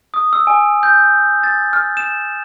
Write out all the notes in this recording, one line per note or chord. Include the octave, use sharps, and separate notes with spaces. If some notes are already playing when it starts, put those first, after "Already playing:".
D#6
E6
G#5
G6
A6
F6
E7